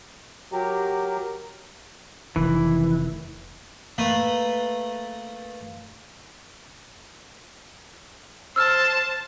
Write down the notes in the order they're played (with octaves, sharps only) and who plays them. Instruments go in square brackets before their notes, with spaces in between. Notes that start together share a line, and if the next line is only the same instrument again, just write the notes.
[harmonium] F#3 G4 A#4
[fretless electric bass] F1 D#3 [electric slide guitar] E3
[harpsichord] A3 A#3 B4
[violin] C5 A5 [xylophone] E6 F6